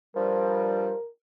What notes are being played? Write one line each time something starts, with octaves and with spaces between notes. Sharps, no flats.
G2 F3 G3 A#4